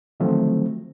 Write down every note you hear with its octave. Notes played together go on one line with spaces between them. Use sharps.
D3 D#3 F3 F#3 A3 C4